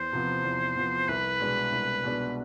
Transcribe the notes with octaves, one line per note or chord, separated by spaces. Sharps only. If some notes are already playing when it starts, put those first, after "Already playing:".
Already playing: E2 C5
C3 F3 B3
E2
C3 F3 B3
C2 B4
B2 G#3 B3 D4
C2
B2 G#3 B3 D4